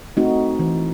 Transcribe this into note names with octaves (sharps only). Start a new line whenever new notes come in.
A3 C4 D#4 F#4
E3